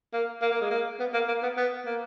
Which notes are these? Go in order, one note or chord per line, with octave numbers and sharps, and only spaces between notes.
A#3
A#3
A#3
G#3
A#3
B3
A#3
A#3
B3
B3
A#3